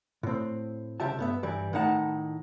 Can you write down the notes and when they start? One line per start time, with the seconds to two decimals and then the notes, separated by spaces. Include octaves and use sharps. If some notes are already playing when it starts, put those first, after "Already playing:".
0.23 A2 C4
1.00 C2 C#3 G4 E5 A5
1.19 G2 B3 E5
1.43 G2 E3 G3
1.73 A2 D#3 D#4 F#5 A5